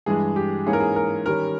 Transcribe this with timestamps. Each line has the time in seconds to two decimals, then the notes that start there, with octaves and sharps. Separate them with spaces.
0.06 G2 E3 G#3 G#4
0.36 G4
0.66 G#2 E3 A#3 C#4 G#4
0.73 A#4
0.80 G#4
0.96 A#4
1.26 D#3 G3 C#4 A#4